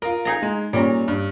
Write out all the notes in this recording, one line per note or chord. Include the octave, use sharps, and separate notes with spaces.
F4 A#4 D#5
D#4 G#4 A#5
G#3
A#2 G3 C#4 A#5
G2